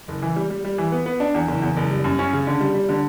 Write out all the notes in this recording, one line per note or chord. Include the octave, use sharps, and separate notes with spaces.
F#1
E3
G3
G3
G3
E3
B3
B3
D4
E2
F#1
E2
F#1
G3
F#2
C#4
C#3
D3
G3
G3
D3